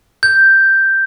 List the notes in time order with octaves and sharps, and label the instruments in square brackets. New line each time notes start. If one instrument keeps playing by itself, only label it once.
[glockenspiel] G6